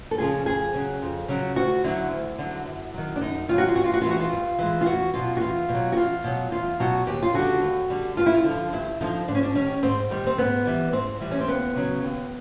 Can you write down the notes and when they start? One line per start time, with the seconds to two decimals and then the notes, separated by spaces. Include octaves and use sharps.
0.11 A4
0.18 C#3 F3 G#3 G#4
0.46 F2 G#4
0.74 C#3 F#3
1.01 F2
1.28 C#3 F#3
1.55 D2 F#4
1.84 D3 F#3 E4
2.11 D2
2.38 D3 F#3
2.66 F#2
2.94 D#3 F#3
3.16 D4
3.21 F#2 D#4
3.49 D#3 F4
3.53 F#3 F#4
3.67 F4
3.76 G2 F#4
3.84 F4
3.94 F#4
4.02 E3 G#3 F4
4.11 F#4
4.20 F4
4.32 G2
4.59 E3 G#3
4.81 F4
4.86 E2 F#4
5.14 B2 F#3 F4
5.37 F#4
5.41 E2 F4
5.69 B2
5.74 F#3
5.92 F#4
5.96 E2 F4
6.24 B2 F#3
6.52 E2 F4
6.80 B2 F#3 F#4
7.07 D#2 G4
7.23 F4
7.34 D3 G3 F#4
7.62 D#2
7.90 D3 G3
8.17 G2 F4
8.26 E4
8.34 F4
8.44 D3 F3
8.72 G2 E4
9.01 D3 F3 D#4
9.28 G#2 D4
9.35 C#4
9.43 D4
9.55 D#3 G3 C#4
9.83 G#2 C4
10.10 D#3 G3
10.27 C4
10.38 G#2 B3
10.65 E3 G3
10.93 G#2 C4
11.21 E3 G3
11.31 C#4
11.41 C4
11.48 D#2 B3
11.75 C#3 F#3
12.03 D#2